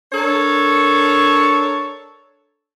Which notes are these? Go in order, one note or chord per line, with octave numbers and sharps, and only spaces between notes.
D4 A4 A#4 C#5